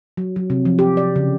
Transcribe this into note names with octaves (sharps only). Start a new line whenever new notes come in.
F#3
F#3
C3
F3
G4
D5
C#3